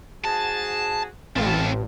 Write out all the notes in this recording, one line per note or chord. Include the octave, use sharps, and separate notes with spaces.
G#2 F#4 G#4 A5
A1 C4 E4 F5 A5